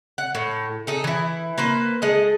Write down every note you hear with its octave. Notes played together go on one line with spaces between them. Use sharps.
F#5
A2
D#4 G#4 A4
E3 E4
A#3 B4 C5
G#3 G#4 A4 D#5